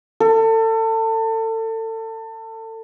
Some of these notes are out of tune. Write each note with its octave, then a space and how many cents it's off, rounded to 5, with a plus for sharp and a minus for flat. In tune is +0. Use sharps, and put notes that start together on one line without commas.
A4 +30